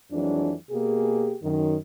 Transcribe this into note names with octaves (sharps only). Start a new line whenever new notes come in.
F2 E3 F#3 G#3 D4
B2 A#3 G4 G#4
F#2 D#3